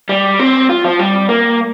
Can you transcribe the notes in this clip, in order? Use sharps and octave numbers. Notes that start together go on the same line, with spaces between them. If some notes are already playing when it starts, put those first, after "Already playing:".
G3
C4
F4
F3
G3
A#3